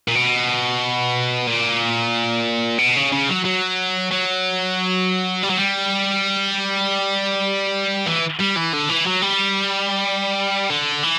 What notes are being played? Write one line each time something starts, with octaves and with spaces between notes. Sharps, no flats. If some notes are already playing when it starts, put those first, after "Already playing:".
A#2
B2
A#2
B2
C#3
C#3
F#3
F#3
F#3
G3
F#3
G3
E3
G3
E3
D3
E3
F#3
G3
D3
E3